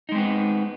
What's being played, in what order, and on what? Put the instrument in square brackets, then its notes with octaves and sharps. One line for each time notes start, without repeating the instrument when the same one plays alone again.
[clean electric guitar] D#4
G#3
C4
B3